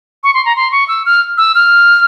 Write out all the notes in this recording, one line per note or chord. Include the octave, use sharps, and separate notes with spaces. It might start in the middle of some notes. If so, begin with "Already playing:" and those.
C#6
C6
A#5
C6
C#6
E6
F6
E6
F6